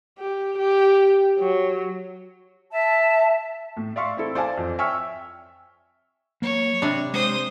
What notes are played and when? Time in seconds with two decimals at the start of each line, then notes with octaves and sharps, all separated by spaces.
0.19 G4
0.58 G4
1.39 F#3
2.71 E5 A5
3.77 A2
3.96 D5 E5 F5 C6 C#6
4.17 C4 E4 A4
4.35 C5 D5 F5 G#5 A5
4.57 F2
4.79 E5 G5 G#5 C#6 E6 F6
6.42 F#3 A#3 C#5
6.82 C3 D4 G4 D5 B5
7.13 G#3 C5 D#6